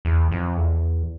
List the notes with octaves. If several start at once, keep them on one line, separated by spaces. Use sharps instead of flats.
E2
F2
E2